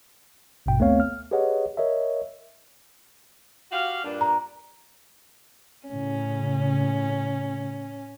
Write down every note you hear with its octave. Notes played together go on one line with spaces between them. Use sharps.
A1 G2 B2 G5
D2 A3 B3 C4 C#5 F5
F6
G4 G#4 B4 C#5 D#5 F#5
A#4 C#5 D#5 E5
F#4 G4 F5
G2 A#2 D4
A#5
A2 C#3 C#4